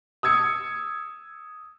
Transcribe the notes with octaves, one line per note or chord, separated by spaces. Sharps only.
D#6 E6 G#6 C#7